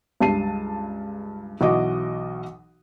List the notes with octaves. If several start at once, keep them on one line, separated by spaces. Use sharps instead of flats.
C#2 G2 A5 C7 D#7
B1 B2 E3 F#4 D#5 D6